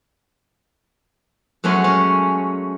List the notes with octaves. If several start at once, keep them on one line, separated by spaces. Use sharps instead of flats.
F#2 G#3 A3 C#4
C#4